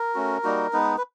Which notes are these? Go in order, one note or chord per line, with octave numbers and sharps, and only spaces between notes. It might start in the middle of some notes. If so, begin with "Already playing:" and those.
Already playing: A#4
A3 C#4 F#4
G3 A#3 D#4 F#4
G#3 B3 D#4 B4
B4